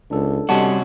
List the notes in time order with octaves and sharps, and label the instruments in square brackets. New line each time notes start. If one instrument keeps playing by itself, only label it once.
[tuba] C#2 [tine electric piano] D4 A4
[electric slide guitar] C3 C#4 F#4 [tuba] G3 [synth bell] D#5 F#5 A5